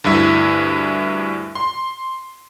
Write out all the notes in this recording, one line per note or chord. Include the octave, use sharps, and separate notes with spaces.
D2 G2 E4 E5
C6